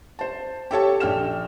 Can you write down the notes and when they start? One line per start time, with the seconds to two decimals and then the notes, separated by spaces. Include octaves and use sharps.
0.19 C5 A5
0.71 G4 A4 C#5 A5
1.00 A#1 G5 F6 E7